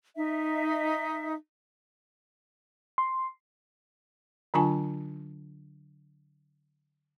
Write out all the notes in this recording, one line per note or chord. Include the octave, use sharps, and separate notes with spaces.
D#4 E5
C6
D3 F#3 D4 F4 G#5 A5